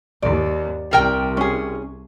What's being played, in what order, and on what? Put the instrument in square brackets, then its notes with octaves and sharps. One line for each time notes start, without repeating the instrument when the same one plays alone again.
[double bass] D#2 [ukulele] D5
[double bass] C2 [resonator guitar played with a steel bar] G3 A#4 G5
[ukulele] C#4 G#4